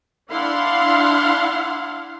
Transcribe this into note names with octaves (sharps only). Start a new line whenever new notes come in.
D4 E4 F5 F#5 C6